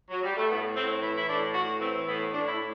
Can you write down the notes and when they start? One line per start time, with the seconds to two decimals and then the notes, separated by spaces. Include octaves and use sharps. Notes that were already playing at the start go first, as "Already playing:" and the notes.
0.10 F#3
0.23 G3
0.37 A3
0.50 A2 B3
0.76 A2 C4
1.02 E3 E4
1.17 E4
1.27 A2 D4
1.54 A2 F#4
1.80 E3 C4
2.06 A2 B3
2.32 A2 D4
2.47 E4
2.59 A2